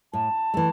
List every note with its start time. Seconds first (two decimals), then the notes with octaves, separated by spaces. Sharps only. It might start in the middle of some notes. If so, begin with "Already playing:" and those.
0.13 A2 A5
0.54 E3 A3